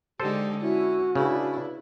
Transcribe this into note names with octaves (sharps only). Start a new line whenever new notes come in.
D3 G#3 D#4 G4 A4 C5
C#4 E4 F#4
C#3 D4 E4 B4